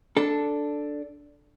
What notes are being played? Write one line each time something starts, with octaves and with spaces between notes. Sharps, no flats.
D4 A4